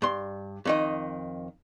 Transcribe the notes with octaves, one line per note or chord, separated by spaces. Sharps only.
G2 C6
F2 D#3 D#5